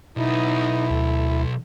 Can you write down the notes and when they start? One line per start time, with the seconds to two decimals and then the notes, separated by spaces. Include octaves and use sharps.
0.17 B1 B3 D#4 E4
0.90 D2 A4